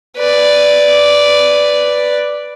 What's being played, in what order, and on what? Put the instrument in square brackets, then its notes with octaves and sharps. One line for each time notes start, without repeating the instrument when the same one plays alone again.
[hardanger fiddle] B4 D5